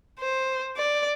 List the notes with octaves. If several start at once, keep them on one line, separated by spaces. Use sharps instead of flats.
C5
D5